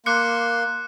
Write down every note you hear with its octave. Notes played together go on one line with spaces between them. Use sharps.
A#3 C6 D6 F#6 C#7